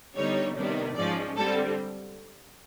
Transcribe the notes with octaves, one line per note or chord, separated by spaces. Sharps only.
D3 G3 B3 D#4 C#5
C3 D#3 G3 B3 D4
G#2 F3 G#3 C#4 D5
D3 G3 C4 A4